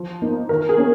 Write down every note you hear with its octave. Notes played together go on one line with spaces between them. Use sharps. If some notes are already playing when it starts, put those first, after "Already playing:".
Already playing: F3
A#3 D#4
D#3 A#4
G#4
A#3 C#4